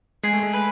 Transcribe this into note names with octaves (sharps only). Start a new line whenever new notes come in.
G#3 G#4
A3
G#3
B4